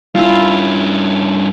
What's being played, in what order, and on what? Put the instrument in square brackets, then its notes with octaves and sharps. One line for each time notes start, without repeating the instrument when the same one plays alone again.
[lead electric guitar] G2 C#4 [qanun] E4 F4